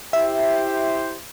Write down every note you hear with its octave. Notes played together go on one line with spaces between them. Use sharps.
E4 G4 C5 E5